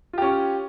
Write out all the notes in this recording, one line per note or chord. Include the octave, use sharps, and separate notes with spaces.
C#4 F4 G4